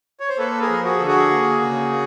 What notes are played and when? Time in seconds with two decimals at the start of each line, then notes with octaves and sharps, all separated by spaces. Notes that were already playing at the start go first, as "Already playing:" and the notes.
0.20 C#5
0.29 C5
0.38 A#3 A4 B4
0.61 G#4 A#4
0.69 F3
0.84 F#4 G#4
0.98 D3 A4
1.07 F#4 G#4
1.30 A#3
1.62 C#3